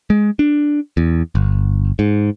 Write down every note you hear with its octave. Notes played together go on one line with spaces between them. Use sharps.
G#3
D4
E2
G1
G#2